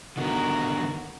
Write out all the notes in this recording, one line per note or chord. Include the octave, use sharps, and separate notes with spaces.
D3 D#3 B3 F#4 A#4